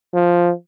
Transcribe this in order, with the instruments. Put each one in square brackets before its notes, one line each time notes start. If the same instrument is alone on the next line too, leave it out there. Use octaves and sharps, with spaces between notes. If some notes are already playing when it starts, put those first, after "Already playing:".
[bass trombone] F3